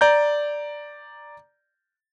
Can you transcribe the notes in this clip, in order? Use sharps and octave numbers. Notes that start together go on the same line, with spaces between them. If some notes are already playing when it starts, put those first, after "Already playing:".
D5 A#5 G6